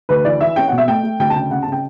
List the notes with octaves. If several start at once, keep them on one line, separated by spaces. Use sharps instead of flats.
D2 B4
E3 D5
E3 E5
C#4 G5
B2 F#5
E5
A3 G5
A3
D2 G5
A5
C#3 G5
C#3 F#5
A5
C#3 G5